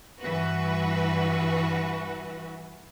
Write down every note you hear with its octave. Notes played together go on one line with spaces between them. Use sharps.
G2 E3 F#4 B4